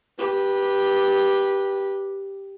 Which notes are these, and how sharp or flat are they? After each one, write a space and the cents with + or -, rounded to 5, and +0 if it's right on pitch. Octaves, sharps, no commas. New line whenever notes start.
G4 +0 B4 -20